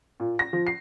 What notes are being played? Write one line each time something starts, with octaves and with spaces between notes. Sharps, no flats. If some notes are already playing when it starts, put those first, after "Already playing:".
A#2
A#6
F3
C7